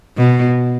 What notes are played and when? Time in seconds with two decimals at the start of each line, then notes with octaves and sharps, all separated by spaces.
0.17 B2